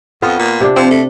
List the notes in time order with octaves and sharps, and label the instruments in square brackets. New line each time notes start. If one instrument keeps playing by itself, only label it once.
[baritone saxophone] F2 [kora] B3 F4
[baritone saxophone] A#2
[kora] C3 D4
[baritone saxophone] F3 [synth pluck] C4
[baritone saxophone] A3